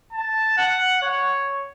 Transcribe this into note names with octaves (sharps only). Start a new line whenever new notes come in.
A5
F#5
C#5